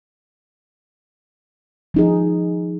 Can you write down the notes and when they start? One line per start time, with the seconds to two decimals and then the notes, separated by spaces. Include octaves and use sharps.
1.94 F3 D#4 G#4